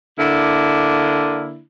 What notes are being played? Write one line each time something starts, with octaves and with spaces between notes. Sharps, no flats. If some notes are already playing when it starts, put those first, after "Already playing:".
D3 A#3 D4 E4